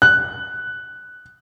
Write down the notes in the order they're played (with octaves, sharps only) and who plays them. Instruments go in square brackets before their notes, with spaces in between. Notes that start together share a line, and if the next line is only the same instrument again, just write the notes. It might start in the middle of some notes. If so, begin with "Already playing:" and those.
[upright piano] F#6